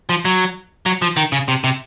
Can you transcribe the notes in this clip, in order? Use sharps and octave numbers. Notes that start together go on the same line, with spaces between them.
F3
F#3
F#3
F3
D#3
C#3
C3
C3